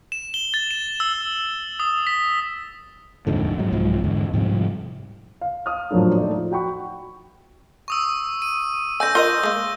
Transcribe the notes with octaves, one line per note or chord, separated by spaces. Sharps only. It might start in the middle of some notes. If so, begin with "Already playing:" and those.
E7
G7
A6
E7
E6
D#6
B6
F1 D#2 G#2 D3
G#2 F#3
C2 G#2 F3 F#3
E2 G#2 D3
G#2 C3 F3 G3
F5
F5 D#6 F6
A2 F3 F#3 A#3 D4
A3 D#4 D5
F3
F#4 F#5 G5 B5 C#6
C#6 D#6 E6
D#7
D3 G#5 E6 G6 A#6
F4 A#4 D#5 G7
G#3 A#3